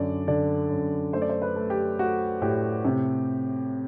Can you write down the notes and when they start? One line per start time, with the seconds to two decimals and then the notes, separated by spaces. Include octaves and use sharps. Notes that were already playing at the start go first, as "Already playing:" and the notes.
Already playing: F#2 D3 D5
0.28 D3 D5
0.70 F#2
1.13 A3 C5
1.22 D5
1.29 C5
1.42 B4
1.56 A3
1.70 G4
1.99 A3 F#4
2.42 A2 G4
2.85 C3